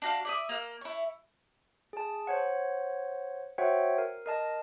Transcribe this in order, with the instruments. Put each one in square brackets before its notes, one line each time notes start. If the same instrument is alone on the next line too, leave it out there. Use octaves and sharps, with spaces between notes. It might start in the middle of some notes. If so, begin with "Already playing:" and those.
[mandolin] D4 F#4 F5
D5 E5 D#6
A#3 F6
E4 C#5
[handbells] G#4 A5
C5 C#5 F#5
F#4 C5 C#5 E5 F#5 G5
A#4
A#4 D#5 A5